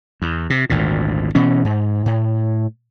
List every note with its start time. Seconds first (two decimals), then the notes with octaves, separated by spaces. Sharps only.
0.22 E2
0.50 C3
0.70 G#1 D2 A#2
1.35 B2 E3 C#4
1.65 G#2
2.06 A2